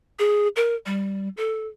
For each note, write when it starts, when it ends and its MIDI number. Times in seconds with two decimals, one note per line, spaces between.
0.19 0.48 68
0.56 0.75 70
0.86 1.29 55
1.37 1.67 69